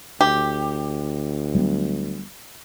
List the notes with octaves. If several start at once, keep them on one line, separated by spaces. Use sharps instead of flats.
D2 G4
F#3 G3 B3